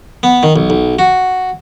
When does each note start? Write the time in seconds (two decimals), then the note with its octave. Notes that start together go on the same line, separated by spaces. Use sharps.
0.23 B3
0.43 D#3
0.56 B1
0.70 B1
0.99 F#4